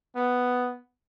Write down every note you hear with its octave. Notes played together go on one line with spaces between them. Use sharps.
B3